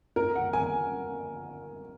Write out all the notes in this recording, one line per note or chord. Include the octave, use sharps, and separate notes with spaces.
A#4
F#5
G#5